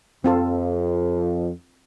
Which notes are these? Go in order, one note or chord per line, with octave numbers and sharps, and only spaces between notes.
F2 C4 F4 A4